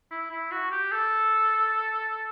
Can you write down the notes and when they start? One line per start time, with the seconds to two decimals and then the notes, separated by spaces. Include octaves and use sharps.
0.11 E4
0.31 E4
0.51 F#4
0.71 G4
0.92 A4